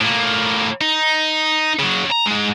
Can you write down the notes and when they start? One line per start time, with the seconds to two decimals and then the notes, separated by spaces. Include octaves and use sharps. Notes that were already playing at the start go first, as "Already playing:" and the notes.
0.01 A2 A#3
0.81 D#4
1.79 C#3 F#3
2.12 A#5
2.27 G#2 G#3